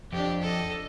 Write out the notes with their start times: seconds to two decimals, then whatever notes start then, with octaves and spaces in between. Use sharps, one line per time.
0.13 F2 D4 G4
0.41 A4 D#5